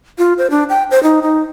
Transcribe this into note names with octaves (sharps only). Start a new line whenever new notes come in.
F4
C5
D4
G5
C5
D#4
D#4